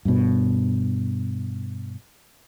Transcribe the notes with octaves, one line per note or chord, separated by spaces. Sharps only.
G2 B2